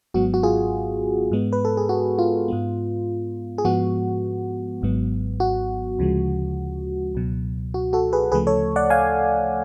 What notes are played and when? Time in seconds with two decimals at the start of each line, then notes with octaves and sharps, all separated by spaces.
0.14 G#1 G#2 F#3 B3 F#4
0.34 F#4
0.43 F4 G#4
1.31 G#2 G#3 B3
1.53 B4
1.65 A4
1.77 G#4
1.89 F#4
2.19 F4
2.48 G#2 G#3 B3
3.58 G#4
3.64 G#2 F3 G#3 B3 F#4
4.82 G#1 G#2 F#3 B3
5.40 F#4
5.99 D2 C#3 F3 G#3
7.15 C#2 B2 F#3
7.74 F#4
7.93 F#4 A4
8.13 G#4 B4
8.32 D2 C#3 F3 A3 G#4 B4
8.47 A4 C#5
8.76 D5 F#5
8.90 F5 G#5